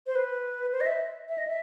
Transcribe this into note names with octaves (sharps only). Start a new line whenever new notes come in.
C5
B4
C5
D#5
E5
E5
D#5
E5